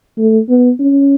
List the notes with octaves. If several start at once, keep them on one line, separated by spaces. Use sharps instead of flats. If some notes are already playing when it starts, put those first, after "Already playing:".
A3
B3
C#4